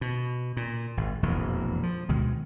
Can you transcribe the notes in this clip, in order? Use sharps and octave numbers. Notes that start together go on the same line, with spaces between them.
B2
A#2
G#1
E1 A#1 F2 E3
F3
D2 B2 D#3 G#3